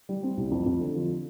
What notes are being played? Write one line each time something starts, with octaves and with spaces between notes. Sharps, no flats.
G3
C4
C2
F2
F2
D3
F3